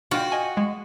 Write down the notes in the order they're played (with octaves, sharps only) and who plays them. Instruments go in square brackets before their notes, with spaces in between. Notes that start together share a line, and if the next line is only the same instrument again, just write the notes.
[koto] F4 G5 [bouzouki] F#4
[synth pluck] D#5 G#5
G#3